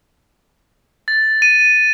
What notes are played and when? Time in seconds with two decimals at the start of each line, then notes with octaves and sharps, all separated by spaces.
1.08 A6
1.42 D#7